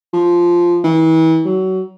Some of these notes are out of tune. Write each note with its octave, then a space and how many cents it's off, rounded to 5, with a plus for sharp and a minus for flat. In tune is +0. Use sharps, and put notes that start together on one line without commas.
F3 -5
E3 -35
F#3 +25